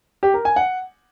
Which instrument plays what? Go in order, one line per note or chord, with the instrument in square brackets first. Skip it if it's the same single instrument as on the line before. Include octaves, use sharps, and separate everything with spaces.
[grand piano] G4
A#4
G#5
F#5